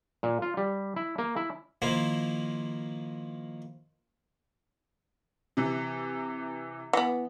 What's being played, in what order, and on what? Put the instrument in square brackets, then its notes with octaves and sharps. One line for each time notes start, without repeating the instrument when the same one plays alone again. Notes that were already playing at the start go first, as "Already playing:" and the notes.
[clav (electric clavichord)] A#2
F4
G3
E4
A#3
E4
[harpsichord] D#3 F3 A#3 E4 C5
[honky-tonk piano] C3 E3
[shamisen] E3 B3